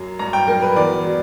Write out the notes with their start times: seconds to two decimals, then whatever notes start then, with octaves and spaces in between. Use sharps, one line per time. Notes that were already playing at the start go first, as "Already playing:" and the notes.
Already playing: F#2 F#3
0.19 G2 A#5
0.33 G5
0.48 F#3 A#4
0.62 B4
0.76 E2 D5
1.05 F#3